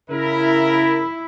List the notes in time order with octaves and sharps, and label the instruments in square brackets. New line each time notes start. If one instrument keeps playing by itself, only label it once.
[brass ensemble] C#3 A#4 [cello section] E4